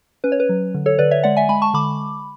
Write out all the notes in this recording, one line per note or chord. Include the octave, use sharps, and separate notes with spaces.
C#4 B4
C#5
B4
F#3
D3
A4 C#5
D3 B4 D5
C#5 E5
G#3 D5 F#5
E5 G#5
G#3 G#5 B5
A5 C#6
D3 B5 D6